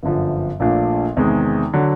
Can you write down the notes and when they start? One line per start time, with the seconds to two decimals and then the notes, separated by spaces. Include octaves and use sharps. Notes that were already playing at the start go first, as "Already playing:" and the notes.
0.03 G1 F#2 D3 F3
0.60 A#1 A#2 F3 A3 D4
1.17 E2 C3 D#3 G#3
1.73 D3 F#3